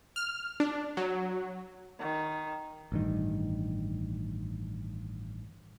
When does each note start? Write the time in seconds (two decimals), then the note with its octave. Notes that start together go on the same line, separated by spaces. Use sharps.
0.16 F6
0.60 D4
0.97 F#3
1.99 D#3
2.92 A1 G2 D#3